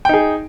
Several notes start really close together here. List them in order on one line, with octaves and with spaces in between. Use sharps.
G5 D#4 G#4